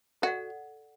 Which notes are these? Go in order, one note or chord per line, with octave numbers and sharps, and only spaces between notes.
F#4 A4 D5 F#5